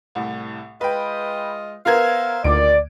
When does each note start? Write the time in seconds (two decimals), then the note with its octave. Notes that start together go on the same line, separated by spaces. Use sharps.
0.15 C2 A2
0.81 G#3 F4 B4 D#5 G5
1.86 B3 A#4 C5 E5 F5 G#6
2.44 D2 A#2 D#3 D5 D7